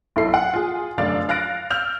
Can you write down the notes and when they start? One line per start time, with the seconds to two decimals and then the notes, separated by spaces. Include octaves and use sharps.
0.16 B1 E4 A4 C7
0.34 F#5
0.54 F4 G#4
0.98 F1 F#2 D3 D4 F5 A6
1.29 F5 F#6 A6 A#6 D7
1.71 E6 F6 G6 F7